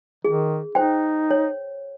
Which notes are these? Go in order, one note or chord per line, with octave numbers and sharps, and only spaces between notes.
D#3 G#4
D#4 C5 G5
C#5